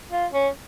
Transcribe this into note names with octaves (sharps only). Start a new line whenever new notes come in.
F4
C#4